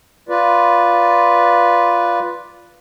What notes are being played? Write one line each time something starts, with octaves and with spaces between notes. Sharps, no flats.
F4 B4 D5